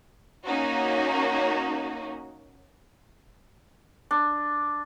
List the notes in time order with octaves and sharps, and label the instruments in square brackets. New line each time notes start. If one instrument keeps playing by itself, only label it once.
[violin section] A#3 C#4 D#4 F#4
[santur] D4